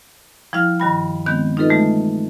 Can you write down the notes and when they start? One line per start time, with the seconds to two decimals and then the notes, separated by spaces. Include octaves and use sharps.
0.53 F3 G3 E4 F5 F6
0.80 G2 D#3 G3 B5
1.26 D#3 G#3 B3 C4 G6
1.57 D#4 F4 A4 B4 D#5
1.70 E3 G#3 A3